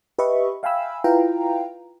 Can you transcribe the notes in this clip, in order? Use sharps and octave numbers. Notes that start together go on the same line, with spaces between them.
G4 B4 D#5 E5 B5 C#6
E5 F5 G5 G#5 B5 E6
E4 F4 B4 F5 G5 A#5